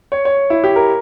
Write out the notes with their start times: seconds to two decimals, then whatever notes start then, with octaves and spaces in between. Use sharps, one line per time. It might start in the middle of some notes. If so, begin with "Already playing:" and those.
0.12 C#5
0.25 C#5
0.50 E4
0.64 G4
0.76 A#4